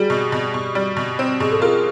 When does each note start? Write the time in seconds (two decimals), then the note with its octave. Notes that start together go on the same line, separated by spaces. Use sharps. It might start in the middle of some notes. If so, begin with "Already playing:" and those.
Already playing: G3 F#4 G#4
0.10 B2
0.32 B2
0.54 B2
0.75 G3
0.97 B2
1.19 C4
1.40 B2 G#4
1.51 A4
1.61 F4 G#4 A#4